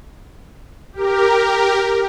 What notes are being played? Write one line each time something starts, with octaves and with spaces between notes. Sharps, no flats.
G4 A#4